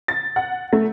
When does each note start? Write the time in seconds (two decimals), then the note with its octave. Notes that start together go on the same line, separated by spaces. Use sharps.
0.08 A6
0.36 F#5
0.73 A3